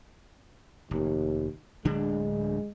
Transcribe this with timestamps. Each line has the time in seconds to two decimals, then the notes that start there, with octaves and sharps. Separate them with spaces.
0.91 F1 D#2
1.85 D1 D3 G#3 D4